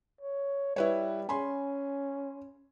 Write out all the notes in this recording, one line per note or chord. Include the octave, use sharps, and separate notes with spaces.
C#5
G3 E4 B4 C#5
C#4 G#5 B5 C6